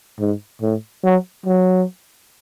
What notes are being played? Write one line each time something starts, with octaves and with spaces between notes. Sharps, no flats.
G#2
A2
F#3
F#3